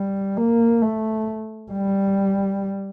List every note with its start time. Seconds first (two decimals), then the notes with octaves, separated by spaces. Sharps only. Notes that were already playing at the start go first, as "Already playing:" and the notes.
Already playing: G3
0.37 A#3
0.82 A3
1.72 G3